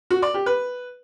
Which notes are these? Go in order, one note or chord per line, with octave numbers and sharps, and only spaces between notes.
F#4
D5
G4
B4